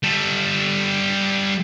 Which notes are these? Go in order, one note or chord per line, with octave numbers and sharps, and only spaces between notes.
G3 A4